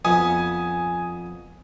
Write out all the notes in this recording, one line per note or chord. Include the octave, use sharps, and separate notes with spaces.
F2 B3 G#5 D#6